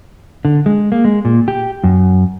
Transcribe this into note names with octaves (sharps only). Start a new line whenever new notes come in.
D3
G#3
A#3
G#3
A#2
G4
F#2